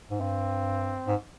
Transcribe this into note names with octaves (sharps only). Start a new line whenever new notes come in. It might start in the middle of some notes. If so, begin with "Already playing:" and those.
G#2
G2 C4
G#2